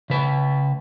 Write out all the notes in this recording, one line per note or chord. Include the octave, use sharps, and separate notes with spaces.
C#3 B4